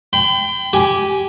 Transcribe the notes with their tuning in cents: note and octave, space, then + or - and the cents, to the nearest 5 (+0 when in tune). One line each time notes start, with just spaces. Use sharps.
G5 +0 B5 +45
G4 -10 G#5 +0